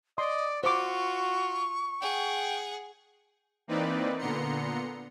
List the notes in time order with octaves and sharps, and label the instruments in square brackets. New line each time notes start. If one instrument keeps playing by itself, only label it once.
[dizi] D5 [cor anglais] D#5 [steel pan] C6
[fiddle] F4 [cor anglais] F#4 [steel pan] C5 D6 [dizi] C#6
[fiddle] G#4 F#5 [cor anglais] G5
[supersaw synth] E3 A#3 C4 D#4 B4 D5
A#2 D3 B3 A#5 C6 C#7